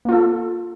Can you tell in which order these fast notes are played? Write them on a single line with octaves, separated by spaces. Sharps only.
A#3 F4 A4